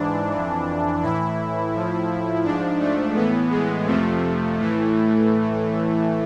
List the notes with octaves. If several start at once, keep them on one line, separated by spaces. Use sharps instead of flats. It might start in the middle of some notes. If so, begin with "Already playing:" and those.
Already playing: G#2 E3 D4
F2 E3
A2 E3 E4
A2 F3
G#2 F3 D4
A3
A2 E3 B3
G#3
F2 C3 F3 A3
A2 E3